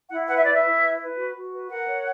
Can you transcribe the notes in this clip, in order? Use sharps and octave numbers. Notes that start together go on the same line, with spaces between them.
E4 F#5
B4 F#5
E5
E4 D5
E5
E4
B4
B4
F#4
F#4
B4
A#4 F#5
C#5